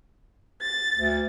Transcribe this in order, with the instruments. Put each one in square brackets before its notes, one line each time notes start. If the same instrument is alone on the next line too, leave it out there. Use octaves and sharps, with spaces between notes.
[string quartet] A6
[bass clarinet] D2